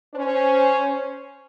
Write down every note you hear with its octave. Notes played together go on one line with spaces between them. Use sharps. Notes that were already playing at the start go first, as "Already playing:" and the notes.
C#4 C5